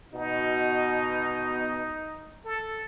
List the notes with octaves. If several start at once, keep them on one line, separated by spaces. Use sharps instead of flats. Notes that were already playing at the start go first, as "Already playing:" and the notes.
B2 D#4
A4